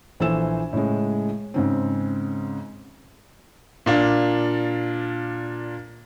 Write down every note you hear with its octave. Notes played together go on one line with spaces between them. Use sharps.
A#1 E3 A4 C5 E6 E7
A2 C#3 G#3
G#2 C#3 C4
A#2 D4 F5